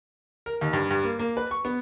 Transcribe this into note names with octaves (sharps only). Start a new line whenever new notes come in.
A#4
D#2
G2
G2
A#3
A#3
B4
C#6
B3